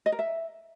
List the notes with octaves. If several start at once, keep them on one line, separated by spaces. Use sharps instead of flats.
D#5
A#4
E5